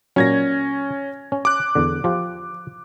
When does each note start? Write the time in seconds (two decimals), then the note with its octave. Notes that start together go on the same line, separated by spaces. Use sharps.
0.16 A#2 F#3 C#4 G#6 A#6
1.32 C#4
1.45 D6 F#6
1.75 E2 D3
2.04 F3 F4 G4